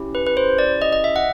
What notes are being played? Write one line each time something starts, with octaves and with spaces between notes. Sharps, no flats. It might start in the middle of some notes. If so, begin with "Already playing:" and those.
Already playing: C#4 E4 G4
B4
B4
C5
D5
D#5
D#5
E5
F#5